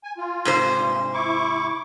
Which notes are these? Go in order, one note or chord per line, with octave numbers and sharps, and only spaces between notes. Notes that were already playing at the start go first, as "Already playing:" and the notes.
G#5
F4
G#2 C3 C5
G2 A#2
E4 C#6 D6